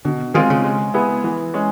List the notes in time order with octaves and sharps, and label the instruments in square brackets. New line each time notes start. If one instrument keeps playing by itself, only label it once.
[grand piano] B2 [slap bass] D3
[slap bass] D#3 [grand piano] G#3 C4 F4 G#4
[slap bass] C#3
[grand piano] G#3
B3 E4 G#4
E3
G#3 C#4